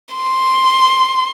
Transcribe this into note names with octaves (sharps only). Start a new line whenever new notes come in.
C6